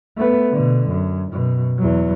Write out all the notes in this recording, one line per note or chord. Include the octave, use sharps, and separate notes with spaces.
A3 B3
B2 D3
F#2
F#2 B2
E2 F#3